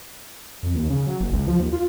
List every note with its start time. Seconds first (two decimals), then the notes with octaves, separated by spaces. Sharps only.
0.63 F2
0.75 D#2
0.90 C#3
1.07 F#3
1.20 F#1
1.33 C#2
1.48 F3
1.59 D#2
1.73 F4